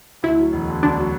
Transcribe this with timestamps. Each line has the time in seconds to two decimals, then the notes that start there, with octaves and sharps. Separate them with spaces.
0.23 D2 E4
0.38 F#3
0.53 E1
0.68 D3
0.83 D2 D4
0.98 F#3